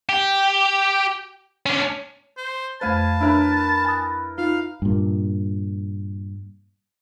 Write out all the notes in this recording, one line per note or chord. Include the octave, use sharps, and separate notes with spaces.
G4
C#4 D4
C5
F2 A3 B4 C5 F5 G#5 A5
D4 E4 A#4 B4 C#5 E5
G#5 B5 D#6
D#4 F4 F5
G2 A#2